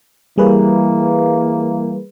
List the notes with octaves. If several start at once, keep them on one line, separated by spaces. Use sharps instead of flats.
E3 G3 A#3 G#4 B4